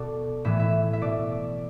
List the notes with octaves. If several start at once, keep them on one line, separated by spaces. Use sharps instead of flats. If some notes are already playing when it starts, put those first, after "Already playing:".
Already playing: B2 A4 D5
A2 E3 E5
E5
E5
B2 D5